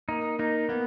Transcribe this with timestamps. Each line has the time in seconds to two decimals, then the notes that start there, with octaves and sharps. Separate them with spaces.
0.09 A#3 D#4
0.39 A#3 D#4
0.69 A#3 B3